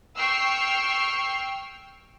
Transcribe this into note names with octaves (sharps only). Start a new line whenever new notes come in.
G5 C#6 E6 F6 C7